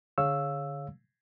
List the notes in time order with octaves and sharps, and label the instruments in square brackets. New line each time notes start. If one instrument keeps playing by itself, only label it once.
[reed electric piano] D3 G#4 C#5 F5 E6